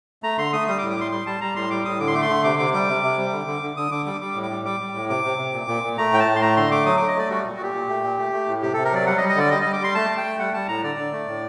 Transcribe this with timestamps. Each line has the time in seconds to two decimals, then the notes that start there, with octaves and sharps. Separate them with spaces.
0.23 A3 A#5
0.38 D3 C6
0.53 A3 D#6
0.68 G3 D#6
0.78 D6
0.82 A2
0.90 D6
0.97 G3 C6
1.12 G3 C6
1.26 G3 A5
1.41 G3 A#5
1.56 A2 C6
1.70 G3 D6
1.85 A2 D#6
2.00 D3 D6
2.07 C6
2.15 A3 D6
2.22 C6
2.30 D3
2.44 C3 D6
2.59 C3 D6
2.74 G3 D6
2.89 C3
3.03 C3
3.18 G3
3.33 D3
3.47 D3
3.62 D3
3.76 D3 D#6
3.91 D3 D6
4.06 G3 D6
4.21 G3 D6
4.35 A2
4.43 D6
4.50 G3
4.65 G3 D6
4.80 G3
4.95 A2
5.09 C3 D6
5.24 C3
5.38 C3
5.53 A#2
5.68 A#2
5.83 A#2
5.98 A3 A#5
6.12 A2 G5
6.20 A5
6.27 A2
6.36 C6
6.42 A3 A#5
6.56 D3 C6
6.71 A3 D6
6.86 F#3 D#6
6.97 A3 D6
7.08 D#5
7.16 A3 D5
7.30 G3 F#4
7.45 A#2
7.52 F#4
7.59 A#2 G4
7.74 A#2
7.89 A3
8.04 A#2
8.19 A3
8.33 A3
8.48 A2
8.62 C3 G4
8.74 C3 A4
8.85 A#4
8.92 F#3 D5
9.06 G3 F#5
9.18 D#5
9.21 G3
9.29 D#5
9.36 D3 D5
9.51 G3 D#5
9.62 G3 D#5
9.73 D6
9.80 G3 C6
9.95 A3 A5
10.10 A3
10.17 G5
10.25 A3
10.39 G3 F#5
10.54 G3 A5
10.68 A2 A#5
10.83 D3 D5
10.98 D3
11.13 A3
11.28 A2